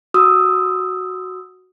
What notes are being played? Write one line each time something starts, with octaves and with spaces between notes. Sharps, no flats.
F#4 D#6 E6